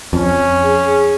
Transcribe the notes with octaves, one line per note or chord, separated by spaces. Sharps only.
F2 C#4
G#4